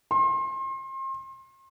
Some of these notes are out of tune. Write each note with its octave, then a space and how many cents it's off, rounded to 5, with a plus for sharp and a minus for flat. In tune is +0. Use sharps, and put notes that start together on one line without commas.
C6 +35